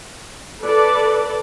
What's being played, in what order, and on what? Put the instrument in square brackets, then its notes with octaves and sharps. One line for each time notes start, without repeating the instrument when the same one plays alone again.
[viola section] A4 B4 D5